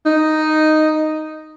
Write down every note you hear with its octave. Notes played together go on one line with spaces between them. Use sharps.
D#4